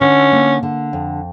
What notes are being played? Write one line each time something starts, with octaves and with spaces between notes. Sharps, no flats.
D3 C#4
A#3
D3
F2